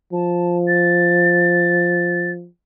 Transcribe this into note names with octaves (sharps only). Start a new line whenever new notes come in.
F3 A5
A6